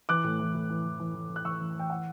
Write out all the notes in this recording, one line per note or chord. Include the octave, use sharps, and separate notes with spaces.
E3 D6 F#6
A2
E3
A2
E3
E3
E3
E3
E3
F#6
E3 C#6 E6
E3
E3 G5
F#5